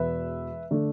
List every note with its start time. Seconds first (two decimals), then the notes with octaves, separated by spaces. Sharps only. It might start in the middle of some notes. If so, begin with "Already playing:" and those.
Already playing: E1 E2 B2 B3 B4 E5
0.71 D3 A3 D4